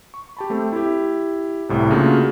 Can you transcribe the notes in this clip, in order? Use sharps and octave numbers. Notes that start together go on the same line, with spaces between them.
C#6
G4 A5 B5
A3 C4 A4
E4 G4
C2 A2 C3
C#3 A3 A#3 D4 F4 F#4